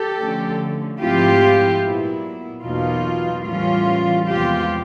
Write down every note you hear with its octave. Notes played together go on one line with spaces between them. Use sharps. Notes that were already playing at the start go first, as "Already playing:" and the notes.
Already playing: G4 A4
D3 F3 A3 C#4
G#2 F3 A3 C4 E4 F4 G4
A#2 F#3 B3 E4
E2 B2 F#3 A#3 D#4 F4
A2 E3 G3 A#3 C#4 F4
E2 C3 F3 G#3 B3 F4 G4